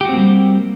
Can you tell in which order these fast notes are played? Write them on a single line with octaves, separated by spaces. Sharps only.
G4 F#4 C4 A#3 G3